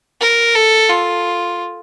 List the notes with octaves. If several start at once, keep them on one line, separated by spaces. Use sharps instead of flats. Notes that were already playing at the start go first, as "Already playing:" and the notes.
A#4
A4
F4